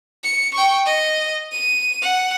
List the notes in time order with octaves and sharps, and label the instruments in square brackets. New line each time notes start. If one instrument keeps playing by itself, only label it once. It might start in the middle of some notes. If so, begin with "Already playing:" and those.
[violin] C#7
G5 C#6
D#5
D#7
F#5